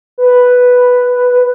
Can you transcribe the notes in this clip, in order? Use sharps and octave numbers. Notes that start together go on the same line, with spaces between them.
B4